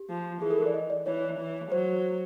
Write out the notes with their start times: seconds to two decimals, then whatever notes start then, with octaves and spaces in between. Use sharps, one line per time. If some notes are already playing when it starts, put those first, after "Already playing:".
Already playing: G4
0.09 F3
0.42 E3 G#4
0.51 A4
0.58 A#4
0.66 D5
0.74 D#5
0.90 D5
1.06 E3 C#5
1.39 E3
1.71 F#3 C5